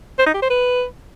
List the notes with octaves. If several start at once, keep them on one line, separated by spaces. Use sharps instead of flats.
C5
D#4
G4
C5
B4